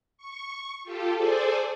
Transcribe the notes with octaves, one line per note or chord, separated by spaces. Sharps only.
C#6
F4 G4 A4
G#4 A4 C5 D5 G#5